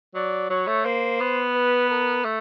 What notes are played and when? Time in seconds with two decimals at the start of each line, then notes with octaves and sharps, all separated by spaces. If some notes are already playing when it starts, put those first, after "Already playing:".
0.15 F#3 D5
0.50 F#3 C#5
0.67 A3
0.85 A#3 C5
1.20 B3
1.55 B4
1.90 A#4
2.25 A3